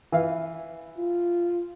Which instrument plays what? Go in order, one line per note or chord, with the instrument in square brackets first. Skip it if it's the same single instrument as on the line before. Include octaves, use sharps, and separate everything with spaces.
[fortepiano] E3 F5
[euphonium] F4